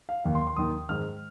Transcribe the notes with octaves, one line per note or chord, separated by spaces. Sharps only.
F5
D#2 D#3 F5
C6
C6
D#2 D#3 D#6
G#2 D#3 F6